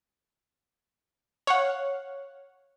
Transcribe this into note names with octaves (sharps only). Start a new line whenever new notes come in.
C#5 F5 F#5